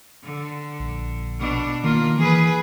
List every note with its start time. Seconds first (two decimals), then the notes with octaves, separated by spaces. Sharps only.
0.24 D3
0.79 A#1
1.39 B2 D4
1.84 D#3 A#3 F4
2.19 E3 G#4 B4